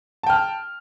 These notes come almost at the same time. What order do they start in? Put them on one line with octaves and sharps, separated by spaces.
A5 G5 F6